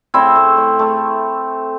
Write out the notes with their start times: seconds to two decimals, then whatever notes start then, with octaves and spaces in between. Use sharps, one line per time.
0.14 A2 C4 E4
0.36 A3
0.57 A2
0.79 A3